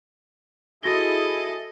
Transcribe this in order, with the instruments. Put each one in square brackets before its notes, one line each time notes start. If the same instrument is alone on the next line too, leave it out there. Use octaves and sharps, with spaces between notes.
[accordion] E4 G#4 [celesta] F#4 A#6 G7 [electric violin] A4 D#5